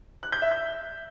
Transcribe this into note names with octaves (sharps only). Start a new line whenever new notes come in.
F#6
G6
E5
G6